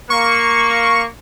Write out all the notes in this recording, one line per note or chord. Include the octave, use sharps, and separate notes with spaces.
A#3 C#6